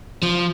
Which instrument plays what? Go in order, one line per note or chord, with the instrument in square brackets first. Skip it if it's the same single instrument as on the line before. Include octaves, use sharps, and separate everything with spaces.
[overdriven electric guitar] F3